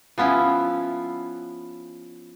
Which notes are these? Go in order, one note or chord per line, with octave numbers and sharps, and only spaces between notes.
F3 B3 C#4 E4